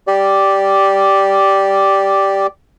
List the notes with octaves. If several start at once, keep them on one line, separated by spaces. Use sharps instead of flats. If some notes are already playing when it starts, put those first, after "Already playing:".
G4 D5